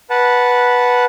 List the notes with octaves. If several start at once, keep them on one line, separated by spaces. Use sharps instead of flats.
B4 F#5 A5